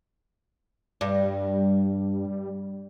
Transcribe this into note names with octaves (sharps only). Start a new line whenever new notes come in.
G2 G3